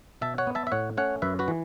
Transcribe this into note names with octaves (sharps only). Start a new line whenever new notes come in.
B2 E5 A5
C#5 F#5
B3
E5 A5
E5
A2 C#5 F#5
A3 C#4 C#5 F#5
F#2 B4 E5
F#4 B4
E3